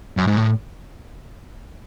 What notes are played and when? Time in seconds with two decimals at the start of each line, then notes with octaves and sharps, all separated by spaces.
0.17 F#2
0.27 G#2
0.37 A2